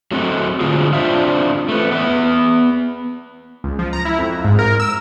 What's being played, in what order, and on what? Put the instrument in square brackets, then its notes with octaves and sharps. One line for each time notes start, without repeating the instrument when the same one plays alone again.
[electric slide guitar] F#3 A3 C4 F#4
A2 D3 G#3 C4 F4 G#4
C4 D4 F4 C5 E5 F5
A3 B4
B3 B4 E5
[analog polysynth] C#2
F3
A#5
E4
F2
G#2
A#4
E6